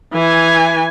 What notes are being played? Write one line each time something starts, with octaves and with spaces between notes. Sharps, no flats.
E3 G#5